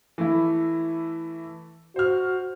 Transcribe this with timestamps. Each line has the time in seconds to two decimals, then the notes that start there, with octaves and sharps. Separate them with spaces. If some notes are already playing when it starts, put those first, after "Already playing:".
0.18 E3 A3 E4
1.96 F#4 C5 F6